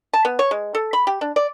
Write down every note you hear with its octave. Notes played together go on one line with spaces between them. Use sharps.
A5
B3
C#5
G#3
A4
B5
G4
D4
D5